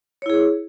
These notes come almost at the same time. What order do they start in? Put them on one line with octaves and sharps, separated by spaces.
C#5 E4 G#4